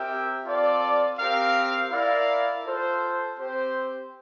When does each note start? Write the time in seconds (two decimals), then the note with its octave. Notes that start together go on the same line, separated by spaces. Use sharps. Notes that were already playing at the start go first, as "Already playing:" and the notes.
Already playing: C4 G4 A#4 E5 G5
0.45 C4 F4 A4 D5
1.18 C4 G4 A#4 F5
1.90 E4 A#4 D5 F5
2.64 F4 A4 C5
3.37 C4 G4 C5